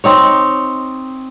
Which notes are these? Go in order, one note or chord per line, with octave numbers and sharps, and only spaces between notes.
C4 D#4 C#5